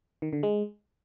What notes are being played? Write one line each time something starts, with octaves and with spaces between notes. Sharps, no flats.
D#3
D3
G#3